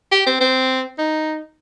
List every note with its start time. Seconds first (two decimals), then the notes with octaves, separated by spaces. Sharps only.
0.12 G4
0.26 C4
0.41 C4
0.98 D#4